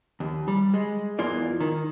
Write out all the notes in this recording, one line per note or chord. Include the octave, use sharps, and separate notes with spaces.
D#2
G3
G#3
E2 E3 A#3 F4 D5
D#3